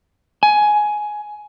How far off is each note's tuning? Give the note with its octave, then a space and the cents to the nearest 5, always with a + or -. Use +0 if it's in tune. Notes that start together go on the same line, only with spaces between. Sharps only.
G#5 +15